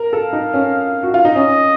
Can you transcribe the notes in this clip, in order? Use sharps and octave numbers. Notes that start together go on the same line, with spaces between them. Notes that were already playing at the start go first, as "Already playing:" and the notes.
Already playing: A#4
A4 F5
D#4
C#4
F#4
F4
D#4
C#4 D#5